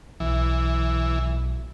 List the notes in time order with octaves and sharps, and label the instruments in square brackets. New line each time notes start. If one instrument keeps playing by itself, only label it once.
[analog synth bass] B1 [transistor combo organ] E3